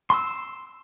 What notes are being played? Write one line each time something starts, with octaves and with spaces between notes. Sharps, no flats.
C6 E6